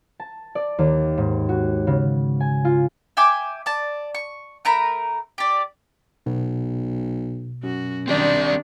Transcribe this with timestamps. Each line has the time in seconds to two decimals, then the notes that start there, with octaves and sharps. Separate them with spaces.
0.20 A5
0.55 D5
0.79 D#2
1.18 G#2
1.49 F#4
1.87 C#3
2.40 G#5
2.65 F4
3.17 E5 G5 G#5 D6
3.66 D5 A5
4.15 C#6
4.65 A3 A#4 A#5 B5
5.38 G4 D5
6.26 B1 B2
7.63 F#2 F#4
8.08 D#3 C4 D4 G4 D5